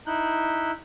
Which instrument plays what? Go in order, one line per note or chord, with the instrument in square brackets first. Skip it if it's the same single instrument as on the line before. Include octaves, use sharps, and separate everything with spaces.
[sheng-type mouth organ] D#4 E4 F#6 G6